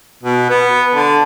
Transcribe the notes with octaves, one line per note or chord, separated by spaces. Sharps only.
B2
B3
D3